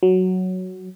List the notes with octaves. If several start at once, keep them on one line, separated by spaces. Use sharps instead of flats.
F#3